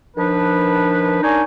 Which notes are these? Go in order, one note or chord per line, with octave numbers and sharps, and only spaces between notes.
D#3 F3 D4 B4
D4 D#4 A#4 C#5 G#5